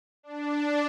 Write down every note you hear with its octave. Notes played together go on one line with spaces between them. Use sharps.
D4